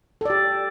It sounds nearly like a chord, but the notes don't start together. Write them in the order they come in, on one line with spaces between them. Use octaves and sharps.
A4 D5 G4